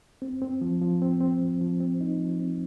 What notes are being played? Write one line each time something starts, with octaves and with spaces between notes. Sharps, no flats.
C4
C4
F3
F3
C4
C4
F3
F3
C4
D#4
F3
C4